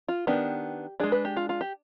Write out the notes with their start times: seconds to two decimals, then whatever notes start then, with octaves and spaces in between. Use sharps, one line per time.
0.08 F4
0.27 D#3 B3 D4 G4
1.00 G#3 D4 G#4
1.12 B4
1.25 G4
1.36 F4
1.49 F4
1.61 G4